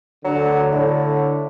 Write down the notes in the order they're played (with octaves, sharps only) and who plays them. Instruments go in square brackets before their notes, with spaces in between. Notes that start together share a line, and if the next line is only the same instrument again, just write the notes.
[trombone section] D2 D3 [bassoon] F#3
[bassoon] A2 [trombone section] D3